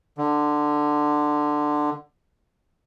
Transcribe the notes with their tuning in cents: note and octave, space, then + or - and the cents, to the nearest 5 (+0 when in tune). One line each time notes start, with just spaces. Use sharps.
D3 +15